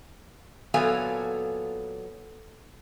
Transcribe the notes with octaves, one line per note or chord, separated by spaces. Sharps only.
A#2 F#3 B3 A4 F5 G#5